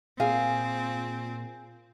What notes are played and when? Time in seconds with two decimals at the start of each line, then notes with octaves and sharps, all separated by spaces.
0.20 A#2 C4 G#4 F5